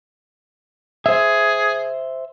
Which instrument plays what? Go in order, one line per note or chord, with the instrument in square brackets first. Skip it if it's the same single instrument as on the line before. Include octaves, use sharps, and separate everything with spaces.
[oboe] G#4 [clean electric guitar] C5 E5